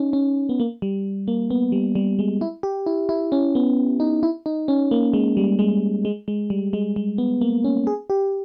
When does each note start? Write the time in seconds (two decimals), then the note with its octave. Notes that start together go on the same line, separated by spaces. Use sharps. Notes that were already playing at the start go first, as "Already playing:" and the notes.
Already playing: C#4 D#4
0.13 C#4
0.49 B3
0.60 A#3
0.82 G3
1.28 A#3
1.50 B3
1.72 G3
1.95 G3
2.19 G#3
2.41 E4
2.63 G4
2.86 E4
3.09 E4
3.32 C#4
3.55 B3
4.00 D#4
4.23 E4
4.46 D#4
4.68 C#4
4.91 A#3
5.13 G#3
5.37 G3
5.59 G#3
6.05 G#3
6.28 G#3
6.50 G3
6.73 G#3
6.96 G#3
7.18 B3
7.41 A#3
7.64 C#4
7.87 G#4
8.10 G4